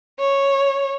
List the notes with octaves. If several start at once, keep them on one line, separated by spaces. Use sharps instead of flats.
C#5